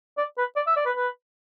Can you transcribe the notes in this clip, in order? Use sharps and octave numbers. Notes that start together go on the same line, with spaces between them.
D5
B4
D5
E5
D5
B4
B4